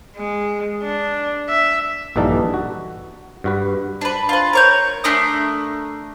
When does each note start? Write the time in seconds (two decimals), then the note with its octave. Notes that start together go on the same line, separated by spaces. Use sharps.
0.17 G#3
0.83 D4
1.49 E5
2.16 A#1 G2 E3 D#4 A4 D5
2.54 F#4
3.44 G2 F#4 B4
4.01 D4 B4
4.29 F4 B4
4.53 A#4 C#5 G6
5.04 A3 D4 A#4 D#6